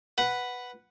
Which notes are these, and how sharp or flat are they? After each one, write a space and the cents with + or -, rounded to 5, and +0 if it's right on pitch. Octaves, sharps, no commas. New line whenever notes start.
B4 +0 F#5 +0